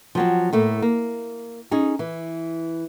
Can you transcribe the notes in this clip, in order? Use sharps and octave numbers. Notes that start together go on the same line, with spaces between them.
F3 F#3 C4
A2 A3 A#3
A#3
C#4 D#4 G#4
E3